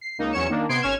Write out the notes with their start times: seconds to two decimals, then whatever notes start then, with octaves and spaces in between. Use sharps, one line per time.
0.01 C7
0.19 C#2 A#3 D#4
0.32 E2 F#3 C#4 C#5 C#7 E7
0.49 D#3 A#3 D4
0.69 C3 B3 C6 G#6 C7 D7
0.82 G#1 C#4 C#5 F6 G#6 E7